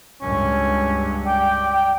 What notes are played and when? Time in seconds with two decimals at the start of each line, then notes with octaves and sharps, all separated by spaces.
0.21 C#2 G2 C#4
1.26 D5 G5